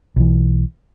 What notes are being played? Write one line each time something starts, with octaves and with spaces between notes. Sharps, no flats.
B1 E3